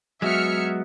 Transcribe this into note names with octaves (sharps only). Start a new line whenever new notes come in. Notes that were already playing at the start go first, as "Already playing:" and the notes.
F#3 G#3 B3 F#4 E5 F6 C#7